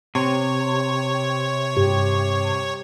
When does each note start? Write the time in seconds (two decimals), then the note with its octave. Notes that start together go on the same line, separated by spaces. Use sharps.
0.15 C3 C#5
1.77 G2 G4